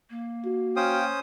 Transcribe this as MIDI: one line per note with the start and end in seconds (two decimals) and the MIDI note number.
0.10 1.10 58
0.45 0.98 66
0.76 1.20 61
0.76 1.20 72
0.76 1.04 77
0.76 1.04 79
0.76 1.20 87